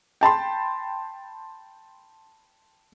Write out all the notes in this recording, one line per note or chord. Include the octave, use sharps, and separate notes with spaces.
G5 A5 B5 C6